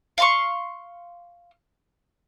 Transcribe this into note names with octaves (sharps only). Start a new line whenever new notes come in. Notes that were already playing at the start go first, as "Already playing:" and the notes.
F5 C6 C#6